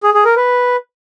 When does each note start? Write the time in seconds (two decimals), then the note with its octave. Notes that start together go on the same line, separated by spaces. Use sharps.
0.03 G#4
0.14 G#4
0.25 A#4
0.36 B4